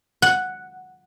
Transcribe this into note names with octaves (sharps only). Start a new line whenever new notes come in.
F#5